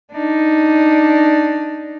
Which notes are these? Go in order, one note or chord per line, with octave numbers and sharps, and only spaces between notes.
D4 D#4